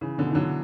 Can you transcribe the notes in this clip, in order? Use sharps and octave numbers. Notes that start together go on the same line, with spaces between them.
C#3 E3
B2 D3
E3
D3 F#3